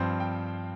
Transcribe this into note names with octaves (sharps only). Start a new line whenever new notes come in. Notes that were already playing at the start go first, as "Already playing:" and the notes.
Already playing: G2 F3 C4 C5
G5